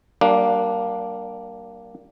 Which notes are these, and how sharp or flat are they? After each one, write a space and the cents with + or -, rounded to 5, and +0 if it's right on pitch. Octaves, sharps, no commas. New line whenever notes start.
G3 -30 A#3 +0 D4 +0